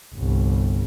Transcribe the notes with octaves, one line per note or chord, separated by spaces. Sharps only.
G1 C2